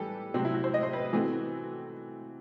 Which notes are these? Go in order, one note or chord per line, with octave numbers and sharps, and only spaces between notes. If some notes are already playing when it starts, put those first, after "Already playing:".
Already playing: E3 G3 G4 A4 B4
C3 F#3 C4 F#4
E4
F#4
C5
D#5
C5
B4
E3 A3 C4 F#4